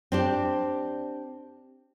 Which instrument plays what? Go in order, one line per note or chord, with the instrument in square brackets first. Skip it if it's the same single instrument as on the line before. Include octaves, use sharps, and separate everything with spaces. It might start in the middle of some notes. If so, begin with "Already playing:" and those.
[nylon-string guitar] C4 D4 G4